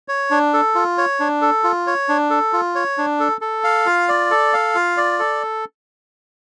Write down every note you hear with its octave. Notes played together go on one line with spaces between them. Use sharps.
C#5
D4
A4
F4
C#5
D4
A4
F4
C#5
D4
A4
F4
C#5
D4
A4
A4
F5
F4
D5
A4
F5
F4
D5
A4